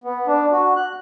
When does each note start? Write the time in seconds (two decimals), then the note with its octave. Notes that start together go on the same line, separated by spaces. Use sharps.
0.04 B3
0.27 D4
0.52 F#4
0.76 F#6